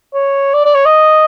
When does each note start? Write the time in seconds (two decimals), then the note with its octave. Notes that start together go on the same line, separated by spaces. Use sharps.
0.14 C#5
0.54 D5
0.65 D5
0.75 C#5
0.86 D#5